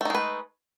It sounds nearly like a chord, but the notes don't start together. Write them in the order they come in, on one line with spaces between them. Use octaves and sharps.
A3 D#4 G#3 B4